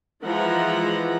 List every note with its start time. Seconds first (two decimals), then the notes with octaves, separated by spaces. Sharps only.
0.23 E3 F3 G#3 E4 F#5 A#5